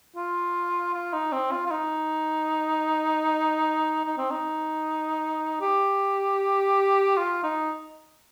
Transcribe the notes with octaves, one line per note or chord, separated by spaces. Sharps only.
F4
F4
D#4
C4
F4
F4
D#4
D#4
C4
D#4
G4
F4
D#4